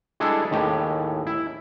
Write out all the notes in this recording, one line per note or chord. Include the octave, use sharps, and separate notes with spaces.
G3 G#3 D4 E4 G#4 A4
D#2 A2 G#3 G4
E4